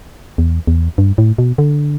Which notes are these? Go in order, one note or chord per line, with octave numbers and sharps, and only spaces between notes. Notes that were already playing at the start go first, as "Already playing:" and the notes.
E2
E2
G2
A2
B2
D3